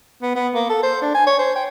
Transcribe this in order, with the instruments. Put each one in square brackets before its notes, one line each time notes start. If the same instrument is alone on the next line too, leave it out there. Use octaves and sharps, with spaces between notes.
[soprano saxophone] B3
B3
A#3
A4
C5
D4
G#5
C#5
C5
G5